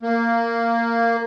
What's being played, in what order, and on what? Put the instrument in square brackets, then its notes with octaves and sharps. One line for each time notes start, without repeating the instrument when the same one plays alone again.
[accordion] A#3